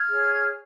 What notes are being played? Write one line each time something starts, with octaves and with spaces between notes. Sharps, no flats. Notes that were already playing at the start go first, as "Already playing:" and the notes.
Already playing: F6 G#6
G#4 C#5